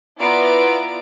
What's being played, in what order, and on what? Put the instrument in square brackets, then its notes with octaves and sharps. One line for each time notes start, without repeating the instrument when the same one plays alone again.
[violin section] B3 E4 F4 D5 A#5 D7